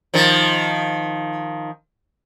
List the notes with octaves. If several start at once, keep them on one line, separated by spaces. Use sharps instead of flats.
D#3 F3